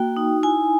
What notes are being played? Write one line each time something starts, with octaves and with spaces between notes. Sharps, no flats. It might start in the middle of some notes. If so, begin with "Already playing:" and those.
Already playing: A#3 F#4 G5
D#4
E4 G#5